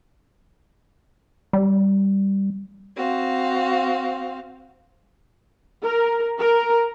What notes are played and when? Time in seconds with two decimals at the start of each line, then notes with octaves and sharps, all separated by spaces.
1.53 G3
2.96 C4 F#4 F5
5.81 A#4
6.39 A#4